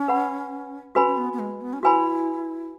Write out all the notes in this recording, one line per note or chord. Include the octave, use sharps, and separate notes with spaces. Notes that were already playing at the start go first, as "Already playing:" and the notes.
Already playing: C#4
B4 F#5 B5
C#4 F#4 B4 G#5 B5
C#4
B3
B3
G#3
B3
C#4
E4 F#4 B4 G#5 B5